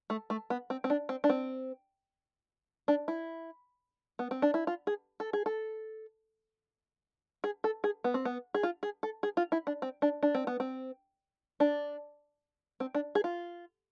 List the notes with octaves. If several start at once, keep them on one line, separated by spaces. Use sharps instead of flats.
A3
A3
B3
C4
C4
D4
C4
D4
C4
D4
E4
B3
C4
D4
E4
F4
G#4
A4
G#4
A4
G#4
A4
G#4
B3
C4
B3
G#4
F4
G#4
A4
G#4
F4
E4
D4
C4
D4
D4
C4
B3
C4
D4
C4
D4
G#4
F4